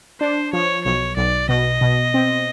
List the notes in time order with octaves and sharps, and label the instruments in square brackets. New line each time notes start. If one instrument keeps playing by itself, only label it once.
[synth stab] D4 [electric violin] C5
[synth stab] F3 [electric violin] C#5
[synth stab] B1 [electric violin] C#5
[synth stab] B1 [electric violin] D5
[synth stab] B2 [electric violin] D#5
[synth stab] B2
C4